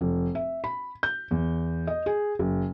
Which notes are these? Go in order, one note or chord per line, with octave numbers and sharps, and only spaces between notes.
F1
E5
B5
G6
E2
D#5
G#4
F#1